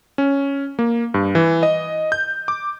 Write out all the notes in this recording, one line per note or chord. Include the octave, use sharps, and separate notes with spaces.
C#4
A#3
G2
E3
D#5
G6
D6